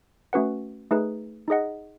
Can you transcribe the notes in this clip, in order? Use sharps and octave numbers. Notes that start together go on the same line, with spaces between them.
A3 C#4 F#4 B4 F#5
A3 D#4 G#4 B4
D#4 G#4 D#5 F#5